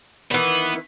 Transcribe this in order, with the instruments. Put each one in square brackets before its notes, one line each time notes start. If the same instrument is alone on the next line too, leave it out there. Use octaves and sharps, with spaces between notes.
[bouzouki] D#3 E3 [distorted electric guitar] B3